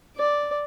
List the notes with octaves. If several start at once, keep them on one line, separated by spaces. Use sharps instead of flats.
D5